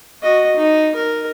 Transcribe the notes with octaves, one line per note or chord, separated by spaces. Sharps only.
F#4 D#5
D#4
A#4